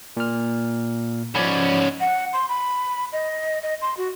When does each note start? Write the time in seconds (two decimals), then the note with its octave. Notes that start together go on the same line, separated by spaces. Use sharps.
0.17 A#2 F6
1.35 G#2 F3 C#4 D5 B5
2.00 F#5
2.33 C6
2.49 B5
3.13 D#5
3.63 D#5
3.82 C6
3.97 F#4